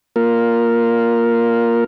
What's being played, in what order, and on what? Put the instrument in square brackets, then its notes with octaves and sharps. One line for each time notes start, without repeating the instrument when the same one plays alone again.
[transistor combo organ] A#3 F4 A#4